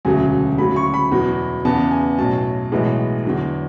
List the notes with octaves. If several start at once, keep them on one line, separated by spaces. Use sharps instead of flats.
E1 D2 C#3 F#3 A3 G#5
D2 C#3 F#3 A3 B5
C#6
B5
E2 B2 F#3
E2 C#3 E3 B3 A5
G#5
B1 A2 F#3 A5
B1 A2 E3 G#3 B3
E2 D3 F#3